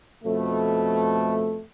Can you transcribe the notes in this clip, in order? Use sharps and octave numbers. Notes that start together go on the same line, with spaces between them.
F2 B2 A3